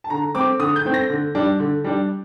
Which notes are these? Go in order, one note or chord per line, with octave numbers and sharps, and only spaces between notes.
A5
D3 A#5
A3 C4 D6
D3 D#6
G6
A3 C4
A#6
D3
G3 D4
D3
G3 D4